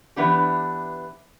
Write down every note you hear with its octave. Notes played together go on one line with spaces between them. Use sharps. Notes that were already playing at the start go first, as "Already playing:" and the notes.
E3 B3 D4 G4